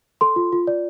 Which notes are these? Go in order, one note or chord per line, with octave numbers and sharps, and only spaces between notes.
A4 C6
F4
F4
D5